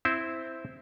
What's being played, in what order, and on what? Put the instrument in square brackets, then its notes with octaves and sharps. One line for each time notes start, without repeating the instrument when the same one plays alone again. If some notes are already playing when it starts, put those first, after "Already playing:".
[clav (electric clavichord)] C4 E4 C5